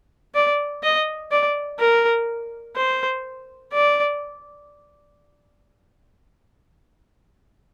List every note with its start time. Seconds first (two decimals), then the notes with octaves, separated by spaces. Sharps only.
0.35 D5
0.83 D#5
1.31 D5
1.79 A#4
2.76 C5
3.72 D5